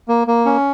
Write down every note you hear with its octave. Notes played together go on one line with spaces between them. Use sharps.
A#3
A#3
C#4